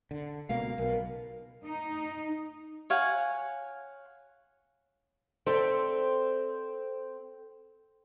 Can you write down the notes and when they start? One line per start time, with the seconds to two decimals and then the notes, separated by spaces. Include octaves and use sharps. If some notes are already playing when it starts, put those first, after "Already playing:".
0.11 D3
0.49 C#2 B2 A#3 F5
0.78 B1 B2 A#4
1.64 D#4
2.90 C#5 F5 F#5 G#5
5.47 C4 A4 D5 E5